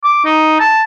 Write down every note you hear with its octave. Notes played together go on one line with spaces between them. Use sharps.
D6
D#4
A5